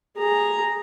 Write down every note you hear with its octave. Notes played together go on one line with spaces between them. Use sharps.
G#4 A#5